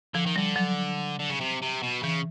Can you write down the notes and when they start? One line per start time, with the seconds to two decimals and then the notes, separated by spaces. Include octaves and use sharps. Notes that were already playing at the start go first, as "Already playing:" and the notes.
0.14 D3 F3
0.26 D#3
0.36 D3 G3
0.56 F#3
1.19 D3
1.30 C#3
1.40 C3
1.62 C3
1.83 B2
2.03 C#3 E3